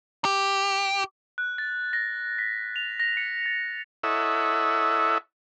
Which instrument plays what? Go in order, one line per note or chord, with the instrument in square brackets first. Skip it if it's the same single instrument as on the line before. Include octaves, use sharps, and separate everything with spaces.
[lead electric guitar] G4
[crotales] F#6
A6
A#6
B6
F7
A#6
C#7
A6
[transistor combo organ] E4 A4 C#5 D#5 E5 F#5